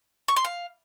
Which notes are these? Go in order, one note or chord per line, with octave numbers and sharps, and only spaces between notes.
C#6
C6
F5